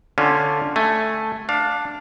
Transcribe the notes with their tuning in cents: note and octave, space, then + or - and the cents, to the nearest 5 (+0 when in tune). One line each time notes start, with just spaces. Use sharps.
D3 +0 C#4 +0 F4 +0
A3 +0 G#5 +0
D4 +0 F5 +20